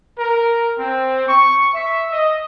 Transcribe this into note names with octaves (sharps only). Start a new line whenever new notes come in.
A#4
C4
C#6
E5
D#5